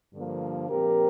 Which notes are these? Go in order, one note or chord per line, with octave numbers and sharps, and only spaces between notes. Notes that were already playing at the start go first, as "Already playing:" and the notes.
G2 D3 F3 A#3
A#2 F3 C4 G4 A#4